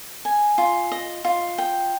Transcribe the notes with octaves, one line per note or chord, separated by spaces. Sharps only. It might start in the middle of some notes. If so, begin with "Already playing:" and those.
G#5
F4
D#5
F4
G5